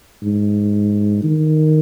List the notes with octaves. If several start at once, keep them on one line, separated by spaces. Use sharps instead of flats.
G#2
D#3